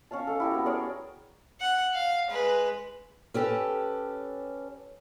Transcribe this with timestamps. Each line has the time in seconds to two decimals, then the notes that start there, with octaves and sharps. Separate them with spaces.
0.11 C#4 C#5 F5 A5
0.27 A4 F5
0.40 E4 G4 A#4
0.51 B3 F#4
0.66 G#4 A#4 C#5 D5
1.61 F#5
1.94 F5
2.30 G#3 B4
3.34 C#4 G4 A4 B4